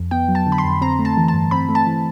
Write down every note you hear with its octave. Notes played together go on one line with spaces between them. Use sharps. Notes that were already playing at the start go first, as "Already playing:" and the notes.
Already playing: F2
B3 G5
F#3
A5
D3
B5
C6
F2
C4 A#5
A3
A5
E3
A5
G2
C4 B5
A3
A5
E3